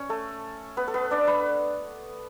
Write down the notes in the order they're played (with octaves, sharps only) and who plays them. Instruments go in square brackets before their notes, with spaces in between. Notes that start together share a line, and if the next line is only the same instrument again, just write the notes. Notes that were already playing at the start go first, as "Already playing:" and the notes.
Already playing: [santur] C#4 C#5
A3 A4
B3 B4
A4
B3 B4
D4 D5
B4 B5